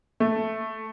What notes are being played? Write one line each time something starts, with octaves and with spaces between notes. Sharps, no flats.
A3